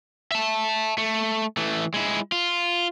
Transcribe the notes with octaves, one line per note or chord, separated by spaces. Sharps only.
E5 A5
A3
E3 A3
G#3 E4
F4